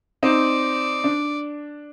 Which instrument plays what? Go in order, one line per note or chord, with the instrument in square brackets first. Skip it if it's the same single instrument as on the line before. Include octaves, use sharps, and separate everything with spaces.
[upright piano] C4 D#4 [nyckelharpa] D5
[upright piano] D4